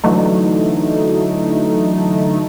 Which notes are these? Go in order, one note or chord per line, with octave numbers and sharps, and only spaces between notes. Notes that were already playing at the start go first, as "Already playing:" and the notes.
D3 E3 F#3 A3 D#4